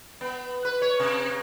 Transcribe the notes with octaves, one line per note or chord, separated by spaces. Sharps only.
B3
B4
C#5
C3